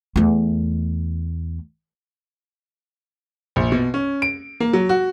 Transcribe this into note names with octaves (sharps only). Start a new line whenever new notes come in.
E2 A3
A#1
B2
C#4
D7
A#3
F#3
F#4